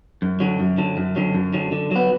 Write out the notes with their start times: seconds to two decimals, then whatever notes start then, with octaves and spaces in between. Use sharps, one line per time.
0.22 F#2
0.40 D3 F#3
0.60 F#2
0.78 D3 F#3
0.97 F#2
1.16 D3 F#3
1.34 F#2
1.53 D3 F#3
1.72 D3
1.91 F#3 B3